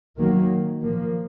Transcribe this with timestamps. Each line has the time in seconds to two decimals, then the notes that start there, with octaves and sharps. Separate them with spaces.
0.17 D#3 F#3 A#3
0.80 A#2 F3 A#3